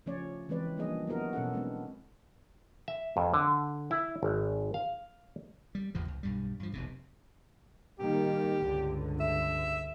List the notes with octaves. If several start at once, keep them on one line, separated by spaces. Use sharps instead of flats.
C#3 F3 A3 C#4 C#5 D5
E3 G#3 C4 B4 D5
F3 G3 A#3 D4 G#4 D#5
F#3 B3 E4 F#4 A#4 D#5
B2 B3 C#4 A4 F#5
G#3 B3 C4 D4
E5
F2
D3
E4
G#1
F5
G3
A1 E2 C#3 F3
C#2
B1 G2 G3
G2 F3
F1 B1 C3
D#3 G3 A#3 G4
C#2 G2 D3
E5